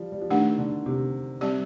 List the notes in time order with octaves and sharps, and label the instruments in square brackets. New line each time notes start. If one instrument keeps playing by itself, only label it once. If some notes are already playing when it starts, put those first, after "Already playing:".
Already playing: [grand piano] F3 G3
G3
F3
[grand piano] D#3 [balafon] A3 D4 G4
[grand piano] D3
C3
[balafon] G3 C4 G4 D5